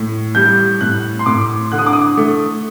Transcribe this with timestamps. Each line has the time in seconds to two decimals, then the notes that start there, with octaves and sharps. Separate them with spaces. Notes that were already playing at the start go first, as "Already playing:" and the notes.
Already playing: A2
0.35 G3 G6
0.81 A2 F#6
1.19 C6
1.26 A2 D6
1.72 D3 F#6
1.78 D#6
1.86 D6
1.93 D#6
2.17 A3